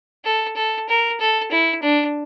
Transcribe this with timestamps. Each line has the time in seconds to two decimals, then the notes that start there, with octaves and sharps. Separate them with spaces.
0.25 A4
0.56 A4
0.89 A#4
1.20 A4
1.51 E4
1.82 D4